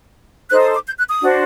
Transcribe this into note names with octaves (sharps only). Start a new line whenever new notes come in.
D#4 A4 C5 F#6
D#6
D6
G6
F#6
D#6
D4 F#4 C5